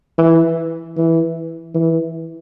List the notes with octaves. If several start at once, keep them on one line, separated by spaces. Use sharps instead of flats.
E3
E3
E3